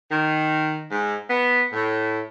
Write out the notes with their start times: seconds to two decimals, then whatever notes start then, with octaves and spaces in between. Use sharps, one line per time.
0.11 D#3
0.90 G#2
1.29 B3
1.72 A2